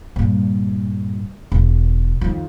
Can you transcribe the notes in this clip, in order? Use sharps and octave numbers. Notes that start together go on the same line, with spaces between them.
G2 A#2
E1
F2 D#3